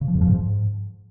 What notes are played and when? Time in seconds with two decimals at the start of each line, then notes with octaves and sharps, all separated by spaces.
0.01 C#3
0.08 F3
0.15 F2
0.21 F3
0.28 G#2